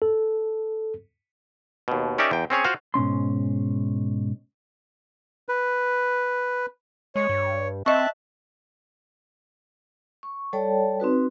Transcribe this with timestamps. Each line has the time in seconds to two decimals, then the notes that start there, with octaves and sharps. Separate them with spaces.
0.02 A4
1.88 D#2 B2
2.18 C#4 D#4 G4 A#4 D5 E5
2.31 E2 G5
2.50 C4 C#4 G#4 C#5
2.64 F4 F#4 C5 F5
2.94 G#2 B2 C#4 C6
5.49 B4
7.16 G#3 C#5
7.29 G2
7.86 C4 D#5 E5 A5 C#6 F#6
10.23 C#6
10.53 G3 A4 C#5 D5 G5 A5
11.00 C4 D#4 F#4 B4